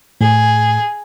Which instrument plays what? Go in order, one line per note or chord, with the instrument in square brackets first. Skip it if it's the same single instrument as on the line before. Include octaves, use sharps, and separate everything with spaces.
[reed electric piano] A2 [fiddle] G#4